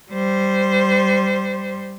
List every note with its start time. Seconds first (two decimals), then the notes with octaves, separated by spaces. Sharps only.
0.12 G3 C5